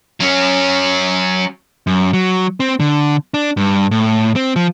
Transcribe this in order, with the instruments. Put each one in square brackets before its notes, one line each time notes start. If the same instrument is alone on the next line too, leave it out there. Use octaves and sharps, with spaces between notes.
[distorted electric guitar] F#3 C#4
[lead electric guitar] F#2
F#3
C4
D3
D4
G2
A2
C4
F3